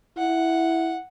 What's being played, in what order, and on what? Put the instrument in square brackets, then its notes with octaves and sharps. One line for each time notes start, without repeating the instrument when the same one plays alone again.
[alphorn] E4 [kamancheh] F#5